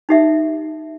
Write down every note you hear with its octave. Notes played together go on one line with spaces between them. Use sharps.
D#4 G4 E5